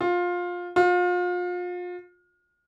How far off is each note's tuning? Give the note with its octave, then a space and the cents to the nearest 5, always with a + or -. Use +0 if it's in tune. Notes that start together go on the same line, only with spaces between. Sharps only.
F4 +20
F4 +35